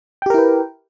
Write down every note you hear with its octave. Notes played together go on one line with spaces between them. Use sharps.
E4 G4 A#4 B4 G5